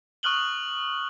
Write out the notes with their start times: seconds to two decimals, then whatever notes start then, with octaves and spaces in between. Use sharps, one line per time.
0.23 C#6 D#6 F6 F#6 F#7 G7